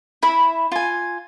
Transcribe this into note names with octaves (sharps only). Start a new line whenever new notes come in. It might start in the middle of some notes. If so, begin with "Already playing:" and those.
E4 E5 B5
F4 G#5